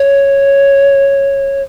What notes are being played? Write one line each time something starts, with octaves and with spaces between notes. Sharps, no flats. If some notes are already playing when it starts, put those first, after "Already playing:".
Already playing: C#5